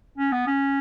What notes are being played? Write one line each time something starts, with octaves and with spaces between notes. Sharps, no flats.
C#4
B3
C#4